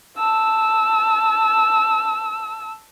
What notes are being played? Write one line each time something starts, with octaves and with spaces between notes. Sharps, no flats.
A5 E6